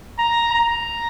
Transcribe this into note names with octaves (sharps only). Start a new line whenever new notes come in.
A#5
A#5